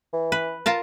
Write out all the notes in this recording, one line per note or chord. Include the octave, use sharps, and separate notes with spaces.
E3
B4
F4 A#4 A5